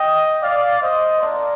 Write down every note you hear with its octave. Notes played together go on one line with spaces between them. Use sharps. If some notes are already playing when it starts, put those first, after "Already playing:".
Already playing: D#5 G5
D5 F5
C5 D#5
A#3 D4 F4 A#4 D5